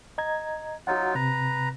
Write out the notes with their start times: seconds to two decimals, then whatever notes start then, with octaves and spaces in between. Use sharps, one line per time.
0.18 D#5 A#5 G#6
0.87 F#3 D#4 F4 F#4 F#5
1.15 C3 B4 A#5